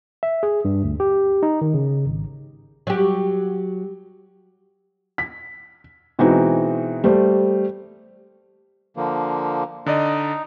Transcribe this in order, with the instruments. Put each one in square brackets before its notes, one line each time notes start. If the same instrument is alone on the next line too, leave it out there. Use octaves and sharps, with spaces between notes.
[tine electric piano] E5
G#4
G2
D2
G4
D#4
D#3
C#3
G#1
[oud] F#3 G4
[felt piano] B6
B2 E3 G#3 C4 D#4 F#4
G3 A3 C5
[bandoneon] D3 F3 A#3
[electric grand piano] D3 D5 D#5 [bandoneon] D#4